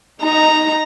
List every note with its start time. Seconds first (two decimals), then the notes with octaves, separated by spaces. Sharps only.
0.22 D#4 A#5